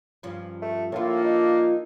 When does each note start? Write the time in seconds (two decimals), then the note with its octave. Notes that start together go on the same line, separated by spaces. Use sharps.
0.23 G2 F3 C#4
0.62 A3
0.92 A2 F3 A#3 D4 F4 A4
1.24 D#4